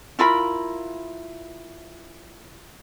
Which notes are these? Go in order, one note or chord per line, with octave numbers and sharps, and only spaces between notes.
E4 F4 A#4 B5